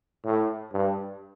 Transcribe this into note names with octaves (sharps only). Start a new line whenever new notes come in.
A2
G2